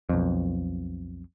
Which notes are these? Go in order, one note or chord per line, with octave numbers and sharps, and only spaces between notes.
B1 F2